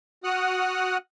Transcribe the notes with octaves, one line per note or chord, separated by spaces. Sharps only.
F#4 F#5 D#6 F6 F#6